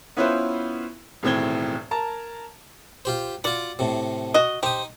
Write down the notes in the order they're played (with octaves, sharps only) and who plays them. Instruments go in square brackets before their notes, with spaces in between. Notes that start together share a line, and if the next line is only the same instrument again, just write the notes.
[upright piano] B3 C#4 E4 F4 B4 C5
E1 D#2 A2 C4 G#6 G7
A#4 A5 A#5
[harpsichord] F4 G4 C5
[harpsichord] F4 F#5 [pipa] F#4 D5
[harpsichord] A2 C3
[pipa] F#4 D#5
[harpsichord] D#4 D#6 [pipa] G4 C5